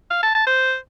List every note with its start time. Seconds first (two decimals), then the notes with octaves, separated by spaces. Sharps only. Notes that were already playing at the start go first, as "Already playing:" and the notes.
0.11 F5
0.23 A5
0.35 A5
0.47 C5